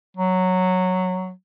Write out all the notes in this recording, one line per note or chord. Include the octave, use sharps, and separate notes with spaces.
F#3